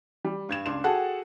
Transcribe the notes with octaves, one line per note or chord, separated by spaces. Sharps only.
G3
G2 G#6 E7
C#2 D4 C6 E7
F#4 G#4 A4 F#5 G5 A5